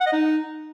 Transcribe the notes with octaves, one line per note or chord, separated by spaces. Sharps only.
F#5
D#5
D#4